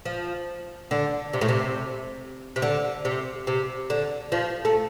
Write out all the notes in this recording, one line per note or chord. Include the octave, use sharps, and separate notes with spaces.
F3
D3
C3
A2
C3
C3
D3
C3
C3
D3
F3
A3